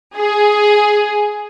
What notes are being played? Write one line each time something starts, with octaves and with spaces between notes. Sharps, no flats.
G#4